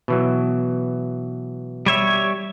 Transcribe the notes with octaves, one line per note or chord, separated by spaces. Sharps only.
B2 E3 F#3
G3 C#5 E5